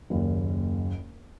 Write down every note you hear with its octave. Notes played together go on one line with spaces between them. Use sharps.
F#1 D#2